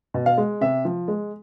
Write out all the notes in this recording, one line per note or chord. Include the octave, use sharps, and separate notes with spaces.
B2
F5
G#3
C3 E5
F3
G#3